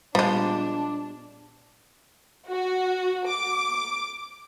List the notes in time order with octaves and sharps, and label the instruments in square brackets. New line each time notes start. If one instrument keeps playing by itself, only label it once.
[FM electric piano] A#2 G3 B3 [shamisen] F3 G#3 [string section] D4
[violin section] F#4
D6